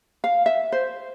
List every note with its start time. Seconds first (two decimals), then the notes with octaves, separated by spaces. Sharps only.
0.24 F5
0.46 E5
0.72 C5